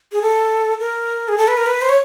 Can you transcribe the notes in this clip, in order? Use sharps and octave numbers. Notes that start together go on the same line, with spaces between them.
G#4
A4
A#4
G#4
A4
B4
A#4
B4
C5
C#5